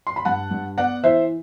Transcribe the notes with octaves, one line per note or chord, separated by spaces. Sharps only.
C6
B5
G2 F#5 A5
G2
B3 D5 F#5
E3 C5 E5